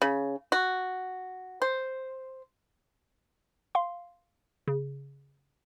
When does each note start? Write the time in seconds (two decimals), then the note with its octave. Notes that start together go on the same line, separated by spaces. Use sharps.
0.02 C#3
0.52 F#4
1.62 C5
3.75 F5 C6
4.68 C#3